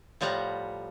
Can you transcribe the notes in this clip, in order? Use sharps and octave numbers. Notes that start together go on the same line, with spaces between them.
A2 F3 G3 F#5 A#5